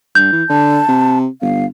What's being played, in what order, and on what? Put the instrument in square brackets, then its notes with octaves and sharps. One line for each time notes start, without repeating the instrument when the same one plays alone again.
[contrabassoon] G2 [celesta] G6
[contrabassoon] E3
[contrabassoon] D3 [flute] A5
[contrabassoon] C3
[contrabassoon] G1 [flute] F5